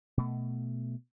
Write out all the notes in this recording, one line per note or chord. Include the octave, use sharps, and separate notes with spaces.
B2 A3